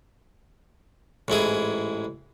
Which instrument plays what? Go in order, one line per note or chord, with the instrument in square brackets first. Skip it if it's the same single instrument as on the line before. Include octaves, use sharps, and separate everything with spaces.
[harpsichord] A1 G#2 E4 G#4